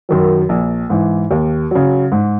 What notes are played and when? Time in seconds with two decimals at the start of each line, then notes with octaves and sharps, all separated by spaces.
0.09 F#2 D#3 F#3
0.49 A#1
0.90 G#2 E3
1.31 D#2
1.71 C#3 F#3
2.12 G#2